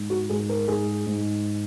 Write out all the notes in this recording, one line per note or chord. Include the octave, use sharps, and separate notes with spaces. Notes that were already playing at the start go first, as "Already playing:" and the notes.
Already playing: G#2
F#4
G#2 G#4
A#4
G#2 G#4
G#2